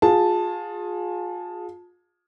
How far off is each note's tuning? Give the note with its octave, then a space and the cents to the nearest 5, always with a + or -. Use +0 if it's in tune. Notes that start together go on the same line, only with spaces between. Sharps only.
F4 +30 G#4 +0 A5 +0